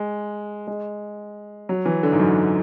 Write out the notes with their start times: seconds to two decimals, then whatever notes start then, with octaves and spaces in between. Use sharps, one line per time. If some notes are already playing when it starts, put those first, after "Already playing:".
Already playing: G#3
0.67 G#3
1.69 F#3
1.86 E3
2.03 D3
2.12 G#2
2.20 F#2